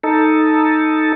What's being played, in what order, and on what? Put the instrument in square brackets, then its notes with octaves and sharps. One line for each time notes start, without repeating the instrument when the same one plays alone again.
[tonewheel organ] D#4 A4